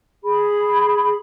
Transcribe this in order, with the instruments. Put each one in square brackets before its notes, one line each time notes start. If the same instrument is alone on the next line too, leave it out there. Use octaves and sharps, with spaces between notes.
[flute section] G#4 B5